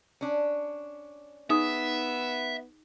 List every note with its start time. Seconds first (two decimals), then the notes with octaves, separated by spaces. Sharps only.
0.21 C#4 D4
1.50 B3 D#4 G#4 E5 D#6